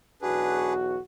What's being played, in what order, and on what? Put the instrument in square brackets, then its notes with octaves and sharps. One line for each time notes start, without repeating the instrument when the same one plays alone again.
[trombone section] B1 E2 F#4 [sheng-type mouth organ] D4 G#4 B4